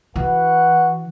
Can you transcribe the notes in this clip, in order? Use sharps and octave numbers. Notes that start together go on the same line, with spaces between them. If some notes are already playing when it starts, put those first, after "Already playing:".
E3 F#4 B4 F#5